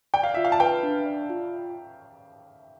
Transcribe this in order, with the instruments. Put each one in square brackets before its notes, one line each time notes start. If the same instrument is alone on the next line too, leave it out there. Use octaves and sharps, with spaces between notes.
[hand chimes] D5 [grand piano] G5
[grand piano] F5
[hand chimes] F4 [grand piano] E5
[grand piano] F5
A5
[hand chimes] B4 [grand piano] G5
[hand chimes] D4
D5
F4